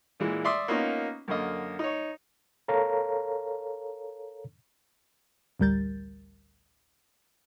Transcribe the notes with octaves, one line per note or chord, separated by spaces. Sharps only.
A#2 E3 G#3
D5 E5 C6 D#6
A#3 B3 C#4 D#4 F4
F#2 D3 A#3 D#5
D#4 C#5
A4 A#4 C#5 F5 A#5
A1 D2 G3 A#4 G6 A6